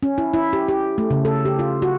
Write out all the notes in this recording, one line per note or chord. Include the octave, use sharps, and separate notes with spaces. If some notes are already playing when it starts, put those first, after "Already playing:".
C#4
E4
E4
G4
G4
A3
C#3
A4
G4
F4
F#4